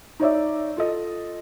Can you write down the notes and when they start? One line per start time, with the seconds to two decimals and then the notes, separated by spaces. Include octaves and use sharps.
0.20 D#4 C#5 D5 E5
0.77 F4 A4 D#5